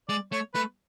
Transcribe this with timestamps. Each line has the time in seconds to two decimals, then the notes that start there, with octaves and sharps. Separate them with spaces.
0.09 G#3 D5
0.32 A3 C#5
0.54 A3 B4